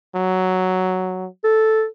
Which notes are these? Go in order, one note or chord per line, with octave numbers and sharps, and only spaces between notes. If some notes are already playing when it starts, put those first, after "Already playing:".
F#3
A4